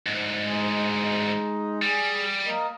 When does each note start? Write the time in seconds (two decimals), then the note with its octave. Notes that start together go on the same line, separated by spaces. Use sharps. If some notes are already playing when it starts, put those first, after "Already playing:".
0.06 D2 G#2
0.42 G#3 D#4
1.82 G3 G#4
2.46 A#3 A#4 D#5